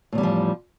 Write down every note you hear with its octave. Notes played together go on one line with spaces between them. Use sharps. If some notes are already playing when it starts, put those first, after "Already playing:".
E2 A2 D3 F3 G3